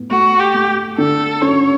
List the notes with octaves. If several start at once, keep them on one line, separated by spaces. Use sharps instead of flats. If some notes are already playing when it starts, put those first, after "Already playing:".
Already playing: A2 B3
A3 F#4
G4
A3
D3 A4
C#4 C#5